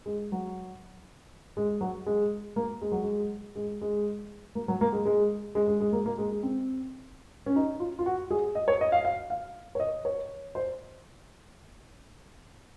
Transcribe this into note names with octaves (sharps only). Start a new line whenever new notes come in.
G#3
F#3
G#3
F#3
G#3
A#3
G#3
F#3
G#3
G#3
G#3
A#3
F#3
A#3
G#3
G#3
G#3
G#3
G#3
A#3
A#3
G#3
G#3
C4
C#4
D#4
F4
F4
F#4
G#4
D#5
C#5
D#5
F5
F5
F5
C#5
D#5
C#5
C5